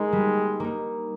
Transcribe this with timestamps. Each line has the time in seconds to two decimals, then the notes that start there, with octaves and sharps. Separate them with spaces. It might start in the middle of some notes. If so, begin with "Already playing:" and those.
Already playing: G#3 A#3 D#4
0.13 G3
0.60 A#3 D#4